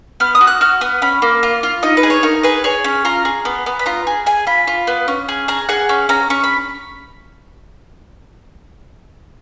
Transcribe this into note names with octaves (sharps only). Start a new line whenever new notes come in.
B3 F6
D#6
F#4
F#6
F#4 F6
B3 D#6
C#4 B5
A#3
F4
F4
D#4 D#5
B4
G#4
C#5
D#4 A#4
G#4 B4
G#4 C#5
C#4
F4 A#5
G#4
B3
B3
B5
F4 A#5
G#4
G#4 G#5
F4 B5
F4
B3
C#4
G#4
G#4 A#5
G#4 F#5
C#4
C#4 A#5
C#4 C#6
B5